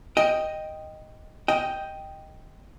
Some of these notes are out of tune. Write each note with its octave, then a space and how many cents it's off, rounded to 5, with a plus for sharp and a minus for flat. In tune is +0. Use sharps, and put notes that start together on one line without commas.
D#5 +0 G5 +0
D#5 +5 G5 +0